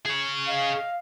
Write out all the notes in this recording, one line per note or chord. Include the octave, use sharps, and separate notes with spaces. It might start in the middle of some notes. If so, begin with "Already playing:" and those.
G#4 C#5
D#5 F5